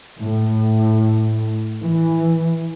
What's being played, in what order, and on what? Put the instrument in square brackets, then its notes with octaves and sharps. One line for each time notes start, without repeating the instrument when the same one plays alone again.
[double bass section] A2
E3